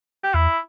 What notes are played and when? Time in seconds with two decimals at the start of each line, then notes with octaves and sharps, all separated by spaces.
0.24 G4
0.34 E2 E4